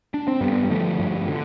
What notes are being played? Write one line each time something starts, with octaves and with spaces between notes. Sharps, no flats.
D4
C4
G2 G3 B3
G3
D3 F3 A3
G2
D3